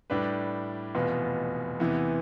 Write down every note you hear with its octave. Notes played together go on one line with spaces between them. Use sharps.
A2 G3 D4 G4 B4
F1 E2 B2 B3 F4
E2 C3 E3 B3 E4